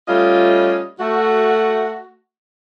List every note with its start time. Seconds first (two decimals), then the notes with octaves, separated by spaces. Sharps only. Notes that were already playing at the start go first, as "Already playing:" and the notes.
0.08 G3 A3 C#4 F4 D#5
0.99 A3 F#4